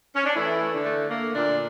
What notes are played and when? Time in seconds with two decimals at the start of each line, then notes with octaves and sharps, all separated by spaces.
0.16 C#4
0.26 D4
0.35 E3 A3 E4
0.60 A3
0.73 D3 D4
0.85 A3
1.09 A3 A#3
1.35 A#2 D3 D4